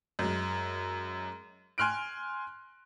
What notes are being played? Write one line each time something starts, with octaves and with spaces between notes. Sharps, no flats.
F#2 G#3
G#5 C6 F6 F#6 D7